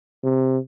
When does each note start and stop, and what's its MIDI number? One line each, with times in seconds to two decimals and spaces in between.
0.24 0.58 48